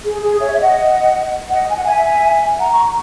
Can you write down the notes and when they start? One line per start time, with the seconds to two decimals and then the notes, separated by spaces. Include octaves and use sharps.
0.05 G#4
0.23 G#4
0.41 C#5 E5
0.53 E5
0.59 D#5 F#5
1.50 D#5 F#5
1.68 G#5
1.77 F#5
1.85 E5 G#5
2.59 F#5 A#5
2.71 A#5 C#6